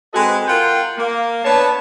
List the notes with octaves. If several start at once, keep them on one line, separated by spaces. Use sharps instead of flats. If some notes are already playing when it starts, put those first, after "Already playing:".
G#3 C4 F#4 A4 B4 D#5
F4 A#4 F#5 G5
A#3
B3 D4 C#5 A5